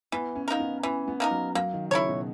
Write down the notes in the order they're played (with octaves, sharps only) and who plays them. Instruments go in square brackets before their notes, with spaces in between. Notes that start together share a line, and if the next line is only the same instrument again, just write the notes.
[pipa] E3 [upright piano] B3
[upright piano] C#4
[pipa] A#3 D#4 A#4
[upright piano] B3
[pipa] E3 [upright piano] C#4
[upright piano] B3
[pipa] A#3 D#4 A#4
[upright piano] F#3
[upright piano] F#3 [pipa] A#3
[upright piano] D#3
[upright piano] C#3 [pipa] E4 A#4 C#5
[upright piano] B2